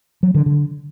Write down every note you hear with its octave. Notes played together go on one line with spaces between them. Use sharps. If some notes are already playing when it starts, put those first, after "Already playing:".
F#3
D3
D3